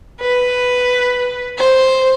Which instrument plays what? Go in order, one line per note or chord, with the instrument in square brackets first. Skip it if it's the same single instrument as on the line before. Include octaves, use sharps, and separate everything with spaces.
[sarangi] B4
C5